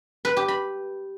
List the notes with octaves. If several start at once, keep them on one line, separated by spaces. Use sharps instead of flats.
B4
G4
B5